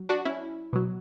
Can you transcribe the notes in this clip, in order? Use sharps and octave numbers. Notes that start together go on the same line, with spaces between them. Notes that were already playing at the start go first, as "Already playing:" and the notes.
Already playing: F#3
D4 F#4
C#4 E4
B2 F#3